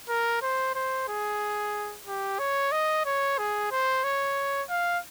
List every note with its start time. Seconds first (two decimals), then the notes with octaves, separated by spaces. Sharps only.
0.09 A#4
0.42 C5
0.75 C5
1.08 G#4
2.07 G4
2.39 C#5
2.72 D#5
3.06 C#5
3.38 G#4
3.72 C5
4.04 C#5
4.70 F5